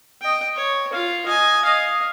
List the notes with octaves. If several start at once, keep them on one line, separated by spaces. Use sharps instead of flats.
D#5 G5
C#5
F4 F5
D#5 G#5
D#5 F5